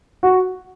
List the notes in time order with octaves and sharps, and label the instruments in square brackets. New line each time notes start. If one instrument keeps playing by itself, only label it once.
[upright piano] F#4